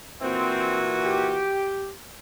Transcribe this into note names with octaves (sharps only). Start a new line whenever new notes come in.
A#2 E3 C4 F#4
G4